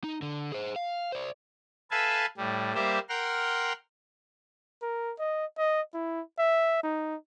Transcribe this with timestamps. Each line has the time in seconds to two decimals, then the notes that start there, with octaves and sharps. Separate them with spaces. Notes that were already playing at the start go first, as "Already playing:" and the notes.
0.04 D#4
0.22 D3
0.52 G#4 C5
0.76 F5
1.12 C5 D5
1.91 A4 B4 E5 F5 G#5 A5
2.37 A2 G3
2.75 G3 A#3 G4 C5 E5
3.09 A#4 F#5 G5 C6 F6
4.82 A#4
5.19 D#5
5.58 D#5
5.94 E4
6.38 E5
6.83 D#4